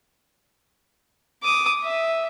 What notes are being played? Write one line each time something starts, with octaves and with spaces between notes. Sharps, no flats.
D6 D#6
E5